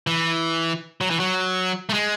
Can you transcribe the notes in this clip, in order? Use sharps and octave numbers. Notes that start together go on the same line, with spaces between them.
E3
F#3
E3
F#3
A3
G#3